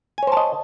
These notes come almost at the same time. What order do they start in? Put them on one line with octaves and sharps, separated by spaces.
G#5 C#5 C5 A5 D#5